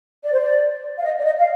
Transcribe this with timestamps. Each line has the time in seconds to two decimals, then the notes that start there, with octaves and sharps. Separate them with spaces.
0.24 D5
0.33 C5
0.40 D5
0.98 F5
1.04 D#5
1.19 D5
1.24 D#5
1.38 F5